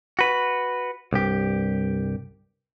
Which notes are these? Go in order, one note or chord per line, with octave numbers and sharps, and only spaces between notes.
F#4 B4
C2 G2 G4